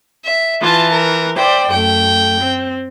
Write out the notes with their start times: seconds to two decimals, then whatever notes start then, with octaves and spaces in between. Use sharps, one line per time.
0.25 E5
0.61 E3 F4 A5
0.91 A#4
1.37 C5 D5 E5 G5
1.70 F#2 A3 G5
2.39 C4